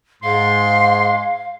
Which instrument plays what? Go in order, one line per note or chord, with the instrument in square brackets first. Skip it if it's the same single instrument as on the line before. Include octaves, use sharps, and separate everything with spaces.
[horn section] G#2 [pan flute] F5 [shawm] C6